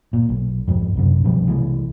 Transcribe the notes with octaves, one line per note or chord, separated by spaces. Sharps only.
A#2
B1
F2 G#2
B1 F#2 C3
B2 F3 G3
C2 E3 F#3 G#3